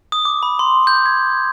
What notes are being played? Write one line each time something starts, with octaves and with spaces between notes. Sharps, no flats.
D#6
D6
B5
C6
G6
G#6